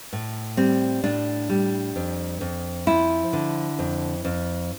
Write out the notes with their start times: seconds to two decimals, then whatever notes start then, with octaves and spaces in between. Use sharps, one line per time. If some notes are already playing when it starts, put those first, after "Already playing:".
0.13 A2
0.57 G3 C4
1.04 A2 D4
1.49 G3
1.96 F2
2.41 F2
2.87 F3 E4
3.33 D3
3.79 F2
4.25 F2